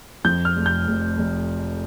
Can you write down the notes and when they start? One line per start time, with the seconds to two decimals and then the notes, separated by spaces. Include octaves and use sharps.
0.24 F2 G6
0.45 F6
0.56 F1
0.66 G6
0.88 F1
1.18 F1